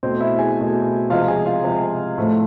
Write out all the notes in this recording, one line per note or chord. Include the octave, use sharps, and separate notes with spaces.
B2 A3 C4 C5
E4 E5
G#4 G#5
B2 A3
C3 F3 G#3 F4 F5
G#4 G#5
F4 F5
C3 F3 G#3
A2 F3 A3